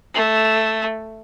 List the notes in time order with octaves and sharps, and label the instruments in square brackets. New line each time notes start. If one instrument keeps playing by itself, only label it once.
[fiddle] A3